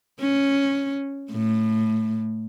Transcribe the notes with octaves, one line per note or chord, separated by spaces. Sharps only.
C#4
A2